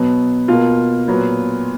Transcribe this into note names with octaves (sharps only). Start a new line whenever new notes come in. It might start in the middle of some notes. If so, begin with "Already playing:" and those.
Already playing: B2 F#3 B3
B2 A#3 F4
A#2 F#3 B3